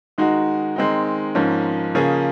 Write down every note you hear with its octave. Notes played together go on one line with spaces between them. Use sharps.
D#3 G#3 D#4 F#4
D#3 G#3 C4 D#4
G#2 F3 A#3 C#4
C#3 F3 A#3 C#4 G#4